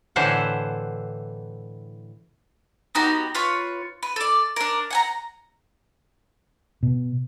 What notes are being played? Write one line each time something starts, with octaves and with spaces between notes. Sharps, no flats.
A2 D3 E3 C5 E5 F#5
B3 D#4 F#4 G4
F4 B4 C#5
B4
A4 D5
D4 A#4
F#5 G#5 A#5
B2